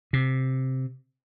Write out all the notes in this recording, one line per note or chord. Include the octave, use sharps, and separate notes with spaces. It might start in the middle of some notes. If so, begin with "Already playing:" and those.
C3